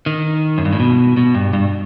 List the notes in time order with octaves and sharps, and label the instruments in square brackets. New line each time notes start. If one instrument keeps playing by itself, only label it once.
[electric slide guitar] D#3
F#2
G2
A2
B2
B2
G2
G2